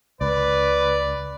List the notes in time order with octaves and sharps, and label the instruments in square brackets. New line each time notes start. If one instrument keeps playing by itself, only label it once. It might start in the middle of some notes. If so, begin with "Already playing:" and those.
[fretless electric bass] C#2 [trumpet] B4 [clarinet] D5